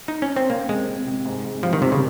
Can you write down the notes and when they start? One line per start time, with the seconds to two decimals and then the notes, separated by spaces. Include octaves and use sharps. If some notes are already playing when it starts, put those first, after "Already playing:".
0.08 D#4
0.22 C#4
0.36 C4
0.50 C3 A#3
0.69 C3 G#3
0.88 C3
1.06 C3
1.26 G#2
1.45 G#2
1.63 F3 G3
1.73 D#3
1.82 C3 G4
1.92 C#3